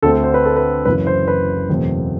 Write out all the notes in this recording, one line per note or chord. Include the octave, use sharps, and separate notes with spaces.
D2 D3 A3 C4 A4
C5
B4
A4
B4
F#1 F#2 E3 B4
C5
B4
F#1 E2 B2 A3 C4